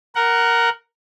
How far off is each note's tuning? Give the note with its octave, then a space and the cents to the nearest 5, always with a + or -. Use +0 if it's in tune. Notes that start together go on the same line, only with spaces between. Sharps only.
A#4 +0 F#5 +15